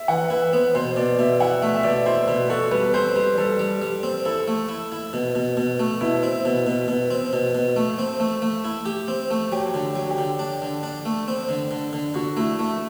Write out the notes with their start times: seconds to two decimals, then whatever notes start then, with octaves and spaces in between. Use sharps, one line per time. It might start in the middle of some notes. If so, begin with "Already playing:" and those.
Already playing: E5
0.08 E3 F#5
0.30 E4 B4
0.53 B3 C5
0.75 B2 C5
0.96 B2 D5
1.18 B2 E5
1.40 E4 F#5
1.62 A3 E5
1.75 E5
1.83 B2 D5
2.06 E4 C5
2.28 B2 B4
2.49 F#4 A4
2.71 G3 B4
2.94 C4 C5
3.16 G3 B4
3.38 G3 A4
3.59 G3
3.82 G3
4.03 C4
4.25 E4 A4
4.48 A3
4.69 E4
4.92 E4
5.13 B2
5.35 B2
5.57 B2
5.80 A3
6.01 B2 E4
6.23 C4
6.45 B2
6.67 B2
6.88 B2
7.10 C4
7.33 B2
7.55 B2
7.76 A3
7.98 C4
8.20 A3
8.42 A3
8.65 E4
8.86 G4
9.08 C4
9.30 A3
9.52 F#3 G4
9.74 D3
9.96 F#3
10.10 G4
10.18 D3
10.39 D4
10.62 D3
10.83 D4
11.05 A3
11.28 C4
11.49 D3
11.71 D3
11.93 D3
12.14 D3 F#4
12.37 A3 E4
12.59 A3